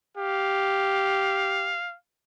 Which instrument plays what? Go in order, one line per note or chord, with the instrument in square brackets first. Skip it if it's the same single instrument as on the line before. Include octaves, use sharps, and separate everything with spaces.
[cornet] G4 [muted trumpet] F5